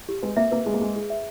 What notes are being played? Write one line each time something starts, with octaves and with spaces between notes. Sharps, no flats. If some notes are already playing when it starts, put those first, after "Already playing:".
G4
G#3 B4
A#3 E5
A#3 B4
G#3 G#4
A#3
G#3 G#4
G#4
E5